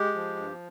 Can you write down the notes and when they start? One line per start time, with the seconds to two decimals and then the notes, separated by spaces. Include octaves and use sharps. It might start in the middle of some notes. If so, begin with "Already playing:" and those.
Already playing: G#3 G4
0.15 F3
0.36 G2